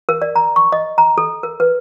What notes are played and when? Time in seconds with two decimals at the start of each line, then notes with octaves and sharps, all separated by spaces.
0.09 A#4
0.22 D5
0.36 A#5
0.56 C#6
0.72 D#5
0.98 A#5
1.18 A4
1.43 A#4
1.60 B4